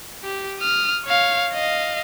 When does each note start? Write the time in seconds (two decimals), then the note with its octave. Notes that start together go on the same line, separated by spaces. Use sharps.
0.23 G4
0.59 D#6 F6
1.05 C#5 F5
1.53 D#5 F5